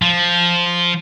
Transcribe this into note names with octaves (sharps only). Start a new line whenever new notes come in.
F3